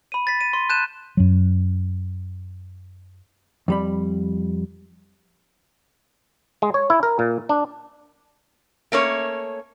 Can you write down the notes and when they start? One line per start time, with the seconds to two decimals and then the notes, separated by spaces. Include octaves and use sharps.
0.12 B5 D#7
0.27 A6 B6
0.41 D#7
0.53 C6
0.69 A5 F#6 G6 D#7 E7
1.17 F#2 F#3
3.68 F2 G3 B5
6.62 G#3
6.74 C#5
6.90 E4
7.03 A#4
7.19 A#2
7.49 D4
8.92 A3 A#3 C#4 C#5